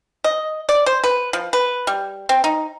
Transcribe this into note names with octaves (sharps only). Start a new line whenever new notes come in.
D#5
D5
C5
B4
F3
B4
G3
C4
D#4